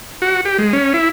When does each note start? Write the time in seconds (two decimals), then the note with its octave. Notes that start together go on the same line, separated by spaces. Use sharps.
0.22 F#4
0.45 G4
0.58 G#3
0.73 C#4
0.94 E4